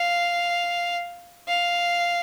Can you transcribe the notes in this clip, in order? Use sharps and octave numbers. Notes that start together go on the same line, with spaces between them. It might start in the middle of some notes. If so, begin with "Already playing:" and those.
Already playing: F5
F5